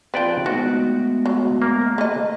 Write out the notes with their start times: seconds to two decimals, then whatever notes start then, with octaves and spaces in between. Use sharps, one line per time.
0.14 F3 C4 B4 D5 G5
0.46 D#3 G#3 A3 B3 F#4
1.26 F#3
1.62 A#3 A#4
1.98 A3 D#5